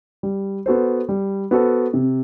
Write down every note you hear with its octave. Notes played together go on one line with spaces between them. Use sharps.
G3
B3 F#4 A4 C5
G3
B3 F#4 A4 C5
C3